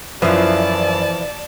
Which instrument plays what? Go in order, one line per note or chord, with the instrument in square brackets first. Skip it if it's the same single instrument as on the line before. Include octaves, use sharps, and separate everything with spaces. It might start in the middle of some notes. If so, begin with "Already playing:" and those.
[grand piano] F#2 [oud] E3 F3 [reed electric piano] B4 C5 E5 [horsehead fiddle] D5 A5